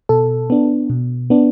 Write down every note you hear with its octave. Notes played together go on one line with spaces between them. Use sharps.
B2 A4
B3 D4
B2
B3 D4